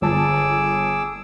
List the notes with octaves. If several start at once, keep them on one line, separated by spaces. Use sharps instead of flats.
G1 F4 G#4 A5 D6 E6